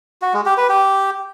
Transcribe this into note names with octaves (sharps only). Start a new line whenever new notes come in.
F#4
G#3
G4
B4
G4